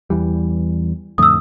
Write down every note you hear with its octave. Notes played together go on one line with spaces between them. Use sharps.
E2 E3 G3
F2 A2 D3 D#6 E6